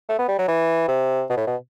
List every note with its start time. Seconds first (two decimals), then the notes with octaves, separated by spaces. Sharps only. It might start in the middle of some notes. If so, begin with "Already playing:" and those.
0.09 A3
0.19 B3
0.28 G3
0.38 F#3
0.48 E3
0.88 C3
1.30 B2
1.37 A2
1.47 B2